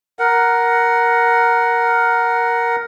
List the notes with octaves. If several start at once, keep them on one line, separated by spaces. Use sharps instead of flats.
A#4 F#5